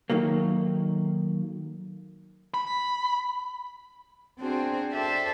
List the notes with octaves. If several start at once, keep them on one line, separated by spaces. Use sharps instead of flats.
D#3 F#3 A3 A#3
B5
C4 D4 F#4 G#4 C5
A4 C5 D5 E5 G5